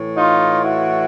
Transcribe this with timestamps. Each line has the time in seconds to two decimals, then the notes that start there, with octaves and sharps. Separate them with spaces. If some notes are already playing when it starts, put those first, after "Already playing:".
Already playing: A2 E3
0.17 D#4 F4
0.64 E4 F#4